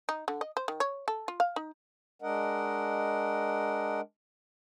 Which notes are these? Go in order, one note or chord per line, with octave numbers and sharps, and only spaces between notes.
D#4
D3
D#5
C5
D#3
C#5
A4
F4
F5
D#4
G#3 D4 A#4 D#5 F#5